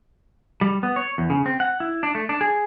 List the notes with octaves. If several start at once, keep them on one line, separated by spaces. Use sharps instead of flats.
G3
B3
C#5
E2
C#3
C4
F#5
E4
D4
A3
D4
G#4